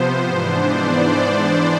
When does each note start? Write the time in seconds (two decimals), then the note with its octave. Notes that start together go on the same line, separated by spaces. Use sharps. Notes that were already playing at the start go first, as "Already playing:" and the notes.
Already playing: C3 F3 B3 C5
0.25 G#2 E3 B3 D4
0.69 D5